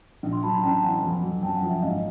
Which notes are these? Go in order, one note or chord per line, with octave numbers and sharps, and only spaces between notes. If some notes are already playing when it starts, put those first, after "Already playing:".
A#1
C6
F#3 A5 B5
A#5
A1 G5 A5
A5
E3 F#5 G#5
F2
F#3
F#2 G5 A5
F#5 G#5
F3
E5 F#5
G#1 D#5 F5